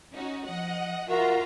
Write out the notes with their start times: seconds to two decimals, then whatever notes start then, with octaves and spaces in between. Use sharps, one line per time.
0.14 C#4 D#4 F#4
0.46 F3 D#5 F#5
1.09 F4 F#4 A#4 E5 A#5